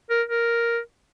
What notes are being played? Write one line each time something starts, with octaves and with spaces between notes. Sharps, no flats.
A#4
A#4